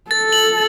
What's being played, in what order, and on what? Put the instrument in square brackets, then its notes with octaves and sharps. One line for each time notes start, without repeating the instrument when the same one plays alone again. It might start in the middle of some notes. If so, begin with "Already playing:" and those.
[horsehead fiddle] A4 [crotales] A6
[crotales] F#7